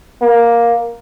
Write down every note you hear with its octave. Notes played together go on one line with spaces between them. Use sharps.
A#3